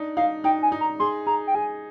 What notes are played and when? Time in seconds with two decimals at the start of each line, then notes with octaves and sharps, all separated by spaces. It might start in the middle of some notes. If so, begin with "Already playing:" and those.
Already playing: D4 D#4
0.17 D#4 F5
0.44 D#4 G5
0.63 G#5
0.72 D#4
0.81 A#5
1.00 G#4 C6
1.27 G#4 A#5
1.47 G5
1.55 G#4 G#5